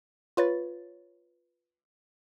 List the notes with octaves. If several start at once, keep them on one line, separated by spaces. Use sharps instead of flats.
F4 B4 C#5 A6